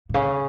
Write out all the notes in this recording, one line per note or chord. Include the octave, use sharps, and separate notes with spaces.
A#2
C#3